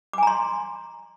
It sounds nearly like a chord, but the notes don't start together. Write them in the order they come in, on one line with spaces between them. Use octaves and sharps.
D6 G#5 A#5 C6